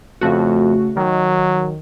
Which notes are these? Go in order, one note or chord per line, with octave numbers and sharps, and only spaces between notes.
F2 C#3 A3 F#4
D#3 F#3